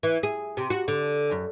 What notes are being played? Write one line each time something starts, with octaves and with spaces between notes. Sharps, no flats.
E3
G#4
C3
F#4
D3
F#2